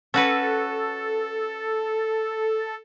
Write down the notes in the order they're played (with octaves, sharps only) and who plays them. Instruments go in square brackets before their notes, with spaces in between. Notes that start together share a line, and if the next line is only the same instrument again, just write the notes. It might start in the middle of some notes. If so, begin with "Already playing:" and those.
[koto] C#4 F#4 B4 [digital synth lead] A4